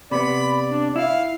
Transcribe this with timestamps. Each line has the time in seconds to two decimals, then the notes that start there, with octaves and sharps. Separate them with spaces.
0.11 C3 B3 D5 B5
0.70 D4
0.96 E4 F5